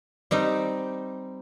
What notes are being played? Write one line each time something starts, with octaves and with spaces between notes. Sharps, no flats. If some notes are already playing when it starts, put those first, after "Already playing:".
G3 C4 D#4